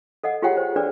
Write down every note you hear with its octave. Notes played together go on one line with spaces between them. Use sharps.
A4 D#5 F#5
F4 G4 G#4 C#5 F#5 G5
C5
D4 G#4 A4 B4 D5